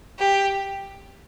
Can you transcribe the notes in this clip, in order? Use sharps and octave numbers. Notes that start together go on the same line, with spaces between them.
G4